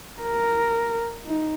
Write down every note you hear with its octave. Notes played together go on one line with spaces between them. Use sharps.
A#4
D#4